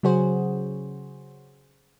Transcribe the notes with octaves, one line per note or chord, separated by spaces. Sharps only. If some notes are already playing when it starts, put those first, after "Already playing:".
C#3 F#3 C#4 F#4 G#4 C5